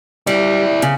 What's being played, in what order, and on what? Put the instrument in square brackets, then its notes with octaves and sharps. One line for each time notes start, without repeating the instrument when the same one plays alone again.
[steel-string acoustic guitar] G3 [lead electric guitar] E4 D5
[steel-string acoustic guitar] C#3